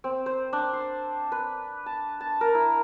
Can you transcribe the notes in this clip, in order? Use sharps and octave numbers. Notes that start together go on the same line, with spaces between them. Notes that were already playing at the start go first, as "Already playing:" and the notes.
C4
C5
D4
C6
B4
A5
A5
A#4
E4